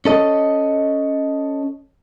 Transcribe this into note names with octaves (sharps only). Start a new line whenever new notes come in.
C#4 A4 D#5